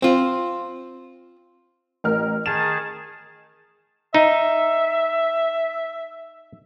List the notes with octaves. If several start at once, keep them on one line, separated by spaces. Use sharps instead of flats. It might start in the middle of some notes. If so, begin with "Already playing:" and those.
C4 F4
A1 A#4 F6
D#3 G#4 A5 E7
D#4 E5